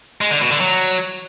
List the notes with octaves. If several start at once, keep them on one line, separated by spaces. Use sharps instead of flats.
G#3
D3
B2
D3
F#3